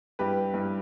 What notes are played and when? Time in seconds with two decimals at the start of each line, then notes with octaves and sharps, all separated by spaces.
0.19 G2 G3 E4 G4 B4
0.54 G2 G3 E4